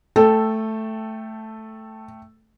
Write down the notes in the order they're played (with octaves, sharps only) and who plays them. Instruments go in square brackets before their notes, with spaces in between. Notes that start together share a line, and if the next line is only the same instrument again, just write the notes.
[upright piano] A3 G5 [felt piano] A4